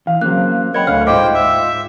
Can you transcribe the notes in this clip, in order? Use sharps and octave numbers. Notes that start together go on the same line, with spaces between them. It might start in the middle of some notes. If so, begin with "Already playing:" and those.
E3 F5
C#3 F#3 A#3 C4 F#6
A#4 C#5 D#5 F#5 G5 B5 G#6
D2 F5 F6
G#2 F4 C5 D#5 F5 G5 D6
E5